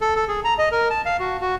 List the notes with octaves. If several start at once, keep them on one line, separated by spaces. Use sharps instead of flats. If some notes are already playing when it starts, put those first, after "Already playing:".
A4
A4
G#4
A#5
D#5
A#4
A5
F5
F#4
F#4